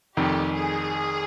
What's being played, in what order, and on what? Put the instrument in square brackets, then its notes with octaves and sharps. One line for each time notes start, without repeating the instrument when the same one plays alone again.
[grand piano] F1 F2 D#3 [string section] G4
[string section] G#4